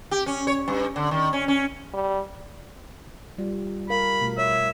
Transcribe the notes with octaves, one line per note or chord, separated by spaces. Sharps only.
G4
C#4
C#5
G2
D3
D#3
C#4
C#4
G3
G3 F4
A#4 F5 B5
B2 A3 F4
C#5 E5